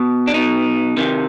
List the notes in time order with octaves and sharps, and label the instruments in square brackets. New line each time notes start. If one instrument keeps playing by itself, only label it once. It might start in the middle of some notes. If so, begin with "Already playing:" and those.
Already playing: [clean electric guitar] B2
D4
B2 D#4
C3 D#3